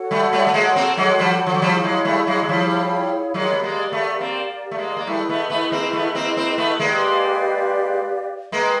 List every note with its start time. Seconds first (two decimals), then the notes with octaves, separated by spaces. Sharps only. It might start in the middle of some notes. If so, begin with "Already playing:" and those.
Already playing: F#4 A4 C#5 F#5
0.11 G3 A3
0.33 G3 A3
0.47 A3
0.54 G#3 A#3
0.76 A#3 C4
0.97 F#3 G#3
1.19 F3 G3
1.47 F3
1.54 F#3
1.62 F3 G3 E4 G#4 C#5 F5
1.84 F#3 G#3
2.05 G3 A3
2.27 F#3 G#3
2.43 F#3
2.49 F3 G3
3.34 F#3 G#3 G4 A#4 D5 F5
3.53 B3
3.63 G#3 A#3
3.92 A3 B3
4.20 A#3 C4
4.71 A3
4.78 G#3 A#3
4.97 A#3
5.07 G3 A3 E4 G#4 B4 D#5
5.29 A3 B3
5.50 A3 B3
5.72 A#3 C4
5.93 A3 B3
6.15 A#3 C4
6.37 A#3 C4
6.58 A3 B3
6.79 G#3 A#3 G4 B4 D5 F5
8.52 G#3 A#3 B4 D#5 G5 A#5